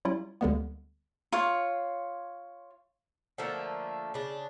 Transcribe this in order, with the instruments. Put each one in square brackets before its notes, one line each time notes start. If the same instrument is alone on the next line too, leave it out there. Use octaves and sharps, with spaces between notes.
[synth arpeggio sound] F#3 G3 C#4 E4 F4
D2 D3 G3 G#3 A#3 B3
[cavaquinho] F4 C#5
[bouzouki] D3 F3 A3 A#3
C#3 D4